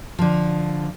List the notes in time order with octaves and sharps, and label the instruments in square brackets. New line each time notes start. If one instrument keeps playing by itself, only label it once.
[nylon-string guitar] D3 F3